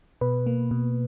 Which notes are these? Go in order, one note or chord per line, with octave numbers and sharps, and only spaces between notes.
B2 B4
A#3
B2